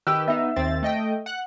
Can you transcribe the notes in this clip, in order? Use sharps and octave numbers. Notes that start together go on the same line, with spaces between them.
D#3 G4 B4 E6
B3 D#4 E5
D#2 C4 A6
A3 D#5 G5
F#5 F#6